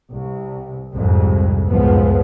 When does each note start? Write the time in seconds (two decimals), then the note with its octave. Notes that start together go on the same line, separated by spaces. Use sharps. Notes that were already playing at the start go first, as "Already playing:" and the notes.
0.13 C2
0.92 C2 F2 G#2
1.68 C#2 F#2 A2 F3 B3